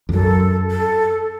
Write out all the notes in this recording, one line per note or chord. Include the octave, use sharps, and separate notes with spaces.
F2
F#2 A4
A4